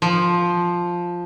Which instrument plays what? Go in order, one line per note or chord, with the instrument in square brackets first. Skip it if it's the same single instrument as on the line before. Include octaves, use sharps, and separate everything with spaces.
[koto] F3